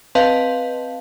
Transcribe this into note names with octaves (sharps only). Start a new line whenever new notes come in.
C4 B4 D#5 F5 A5